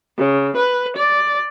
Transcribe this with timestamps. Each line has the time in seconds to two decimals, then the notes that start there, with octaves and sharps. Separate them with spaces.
0.18 C#3
0.57 B4
0.97 D5